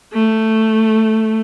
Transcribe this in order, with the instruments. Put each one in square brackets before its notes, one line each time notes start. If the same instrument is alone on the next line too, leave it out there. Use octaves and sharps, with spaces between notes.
[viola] A3